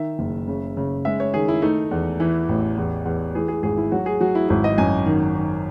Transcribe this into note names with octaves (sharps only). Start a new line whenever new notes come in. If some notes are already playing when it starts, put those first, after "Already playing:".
Already playing: D#3 E5
F#1
C#3
C#3
G#3 E5
C#5
D#3 G#4
E4
A3 D#4
E2
E3 E4
A1
E2
E2
E3 G#4
G#4
G#1 G#4
E4
F#3 F#4
G#4
F#3 F#4
E4
G#1 E4
D#5
F#2 G#5
D#3
D#3